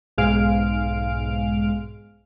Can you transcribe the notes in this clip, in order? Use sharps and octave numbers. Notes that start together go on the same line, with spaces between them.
B1 G#2 G#3 F5 F6 D7